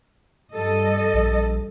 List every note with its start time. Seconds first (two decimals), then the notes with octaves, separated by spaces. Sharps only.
0.52 G2 A4 D#5
1.13 A#1